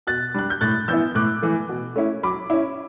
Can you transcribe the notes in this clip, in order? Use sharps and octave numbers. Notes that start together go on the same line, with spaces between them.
B2 F#6 A6
G3 D4 F#6
G6
A2 F#6 A6
E3 B3 E4 E6 G6
A2 D6 F#6
E3 A3
B2
A3 C#4 E4
F#3 B5 D6
C#4 E4